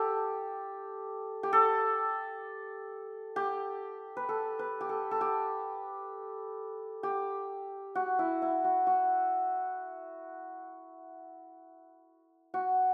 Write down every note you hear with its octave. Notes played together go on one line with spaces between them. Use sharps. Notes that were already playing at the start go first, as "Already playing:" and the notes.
Already playing: G4 A4
G4
A4
G4
B4
A4
B4
G4
A4
A4
G4
G4
F#4
E4
E4
F#4
F#4
F#4